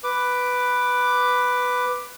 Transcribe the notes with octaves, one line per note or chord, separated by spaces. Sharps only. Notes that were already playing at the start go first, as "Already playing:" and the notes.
B4 D6